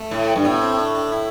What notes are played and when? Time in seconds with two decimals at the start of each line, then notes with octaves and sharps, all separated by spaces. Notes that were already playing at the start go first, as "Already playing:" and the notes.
Already playing: A3
0.11 A2
0.36 G2
0.44 A2 B3
0.61 C4
0.78 D4
0.95 D4
1.12 E4